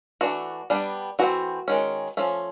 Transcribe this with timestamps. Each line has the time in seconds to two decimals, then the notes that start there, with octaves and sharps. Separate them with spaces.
0.21 E3 A3 D4 F#4
0.70 G3 B3 D4
1.19 E3 A3 C4 F#4
1.68 D#3 G#3 C#4
2.17 F3 A3 C#4